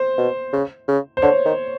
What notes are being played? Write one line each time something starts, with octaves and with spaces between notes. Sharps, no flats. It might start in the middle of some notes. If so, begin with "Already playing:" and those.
Already playing: C5
B2
C#3
C#3
C5
D3 C#5
D#3